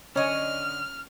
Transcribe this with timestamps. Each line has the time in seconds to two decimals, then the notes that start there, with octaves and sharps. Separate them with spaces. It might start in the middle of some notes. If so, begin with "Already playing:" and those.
0.16 D3 C#4 C#5 D#5 F6